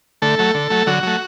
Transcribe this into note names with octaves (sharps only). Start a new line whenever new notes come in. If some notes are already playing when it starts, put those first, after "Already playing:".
D3 A3 A4
F#3 A3
D3
F#3 A3
D3 F#3 F#4
F#3 A3